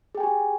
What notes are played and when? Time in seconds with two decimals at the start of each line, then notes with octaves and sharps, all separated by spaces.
0.15 G#4
0.17 G5
0.20 G#5
0.23 G4